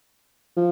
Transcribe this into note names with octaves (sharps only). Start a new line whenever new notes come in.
F3